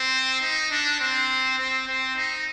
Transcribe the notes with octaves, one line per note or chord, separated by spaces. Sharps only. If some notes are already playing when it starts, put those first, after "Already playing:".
Already playing: C4
D#4
D4
C4
C4
C4
D#4